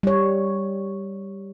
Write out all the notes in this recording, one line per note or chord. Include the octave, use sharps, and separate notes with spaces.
G3 C#5